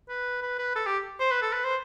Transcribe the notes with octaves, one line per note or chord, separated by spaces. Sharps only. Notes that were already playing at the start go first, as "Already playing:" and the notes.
B4
B4
B4
A4
G4
C5
B4
A4
B4
C5